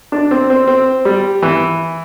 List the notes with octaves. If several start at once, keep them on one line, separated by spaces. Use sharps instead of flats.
D4
C4
C4
C4
G3
E3